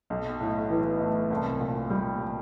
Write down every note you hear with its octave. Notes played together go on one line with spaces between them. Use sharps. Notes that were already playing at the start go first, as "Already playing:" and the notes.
B1
A2
E3
A3
C2
A#2
G3